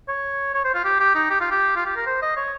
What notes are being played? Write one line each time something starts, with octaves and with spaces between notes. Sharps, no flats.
C#5
C#5
C5
F4
G4
G4
D#4
G4
F4
G4
F4
G4
A#4
C5
D#5
C#5